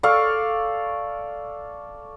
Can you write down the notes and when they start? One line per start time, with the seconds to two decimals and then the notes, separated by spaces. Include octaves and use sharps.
0.03 A4 D5 F5 C#6